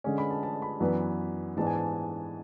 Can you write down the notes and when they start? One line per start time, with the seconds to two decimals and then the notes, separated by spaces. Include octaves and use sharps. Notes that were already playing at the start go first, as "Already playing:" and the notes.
0.04 D3 G#3 C#4
0.18 B5
0.31 A5
0.43 A5
0.62 B5
0.80 F#2 E3 B3 D4
1.56 G#2 E3 G#3 B3 D4 A5
1.67 G#5
1.76 A5